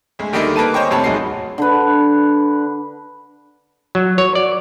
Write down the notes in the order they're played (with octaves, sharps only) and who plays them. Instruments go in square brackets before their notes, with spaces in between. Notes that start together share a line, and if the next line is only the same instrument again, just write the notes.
[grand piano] D2 G#3
D3 D#3 G3 A3 A#3 D#4
A#3 B4 A5 D#7
C#4 C5 C#5 D#5 G5 C#6
D#2 A2 C3 C#5 A5 B5
F1 B1 G#3 D#4 F#4 C7
[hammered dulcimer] D3 B4
[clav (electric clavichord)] F#3
C#5
D5